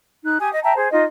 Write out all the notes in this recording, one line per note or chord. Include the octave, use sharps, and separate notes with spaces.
D#4 F#6
G4 G#5 D#6
D#5
E5 G5 A5 A#5
G#4 C5
D#4 F4 D#5